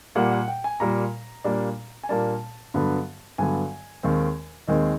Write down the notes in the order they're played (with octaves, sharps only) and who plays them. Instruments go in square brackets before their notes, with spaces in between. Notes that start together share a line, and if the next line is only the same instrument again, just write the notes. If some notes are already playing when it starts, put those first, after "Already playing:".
[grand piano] A#2 G3 A#3 F#5
F#5
G5
G#5
A#2 G3 A#3 A#5
A#2 G3 A#3 D4
G#5
A#2 G3 A#3 D4 A5
G2 D3 F#3 B3
G2 D3 F#3 B3 G#5
D#2 D#3 G#3 C4
D#2 D#3 G#3 C4 D#5